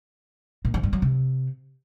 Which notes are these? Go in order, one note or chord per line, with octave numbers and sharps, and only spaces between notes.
A#2
F3
G2
F#3
C3